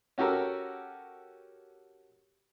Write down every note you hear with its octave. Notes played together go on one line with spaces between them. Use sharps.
C#4 F#4 G4 A4 A#4